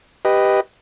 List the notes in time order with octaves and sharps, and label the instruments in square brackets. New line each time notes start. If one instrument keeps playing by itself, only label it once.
[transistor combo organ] G4 B4 D#5